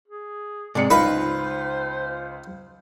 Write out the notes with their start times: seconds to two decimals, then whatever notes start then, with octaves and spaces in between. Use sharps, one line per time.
0.08 G#4
0.75 G#2 C3 G#3 D5 C#7
0.91 C#2 D#4 F4 B4 C5 F5